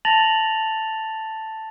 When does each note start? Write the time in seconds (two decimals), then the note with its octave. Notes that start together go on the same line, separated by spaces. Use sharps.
0.05 A5 A6 A#6 F7 F#7